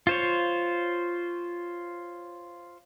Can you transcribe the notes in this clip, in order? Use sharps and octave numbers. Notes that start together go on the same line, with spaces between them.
F4 C5 C#5